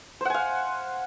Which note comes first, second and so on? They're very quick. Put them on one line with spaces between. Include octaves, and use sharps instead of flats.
C5 F#5 G#5 F5